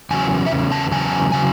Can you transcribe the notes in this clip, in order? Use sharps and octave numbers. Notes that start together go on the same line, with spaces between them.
E2 C#3 F#3 G#5
E5
E2 C#3
A5
E2 C#3 F#3 G#5
C#3 F#3 G#5